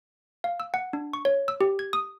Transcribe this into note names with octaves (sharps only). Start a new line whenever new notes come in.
F5
E6
F#5
D4
C#6
C#5
E6
G4
G#6
D#6